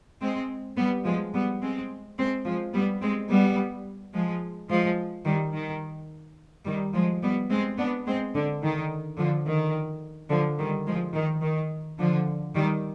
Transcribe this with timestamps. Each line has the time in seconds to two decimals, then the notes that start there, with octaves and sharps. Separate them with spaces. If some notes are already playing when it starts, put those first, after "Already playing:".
0.21 G#3 C4
0.77 G3 B3
1.05 F3 G#3
1.33 G3 B3
1.61 G#3 C4
2.18 G#3 C4
2.45 F3 G#3
2.74 G3 B3
3.02 G#3 C4
3.30 G3 B3
4.13 F3 G#3
4.70 F3 G#3
5.26 D#3 G3
5.54 D#3
6.65 D#3 G3
6.94 F3 G#3
7.22 G3 B3
7.50 G#3 C4
7.78 B3 D4
8.06 G#3 C4
8.35 D3
8.63 D#3
9.18 D3 F3
9.46 D#3
10.30 D3 F3
10.58 D#3 G3
10.87 F3 G#3
11.14 D#3
11.42 D#3
11.99 D3 F3
12.55 D#3 G3